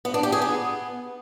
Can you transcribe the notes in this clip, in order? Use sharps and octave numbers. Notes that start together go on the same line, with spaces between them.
B3
D4
G4
G#4
B3